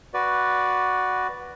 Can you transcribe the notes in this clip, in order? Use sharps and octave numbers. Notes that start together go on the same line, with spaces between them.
F#4 B4 D5